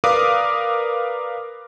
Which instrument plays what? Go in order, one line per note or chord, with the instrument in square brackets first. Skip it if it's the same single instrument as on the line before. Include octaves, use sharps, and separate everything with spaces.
[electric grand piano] A#4 B4 D5 F5 D6 D#6